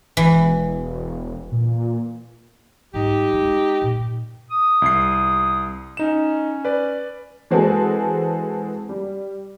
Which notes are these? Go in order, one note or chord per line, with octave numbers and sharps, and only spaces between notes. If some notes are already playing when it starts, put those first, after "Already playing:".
E1 E3
A#2
G#2 G3 D#4 G4
G#3 C4
A#2
D#6
C2 C7
C#4 D#4 E7
B4 D5
E3 G#3 C4 F#4 G#4 A4
G3